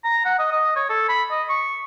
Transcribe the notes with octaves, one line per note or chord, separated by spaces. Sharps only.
A#5
F#5
D#5
D#5
C#5
A4
B5
D#5
C#6